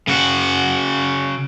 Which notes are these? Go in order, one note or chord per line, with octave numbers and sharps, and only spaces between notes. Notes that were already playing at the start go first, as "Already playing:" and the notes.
C#3 F#4